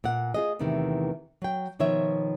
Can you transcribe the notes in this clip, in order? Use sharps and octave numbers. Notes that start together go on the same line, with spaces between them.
A#2 F#5
F4 G#4 D#5
E2 A2 C3 D#3 E3
F#3 G5
B2 D#3 F3 C#5 E5